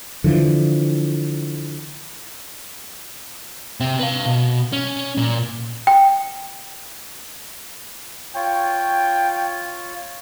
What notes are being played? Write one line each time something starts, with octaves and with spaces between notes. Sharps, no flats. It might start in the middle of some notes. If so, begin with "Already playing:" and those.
D3 E3 F3
C3 C4
B4 F5
B2
C#4
A#2
G5
F4 C#5 G5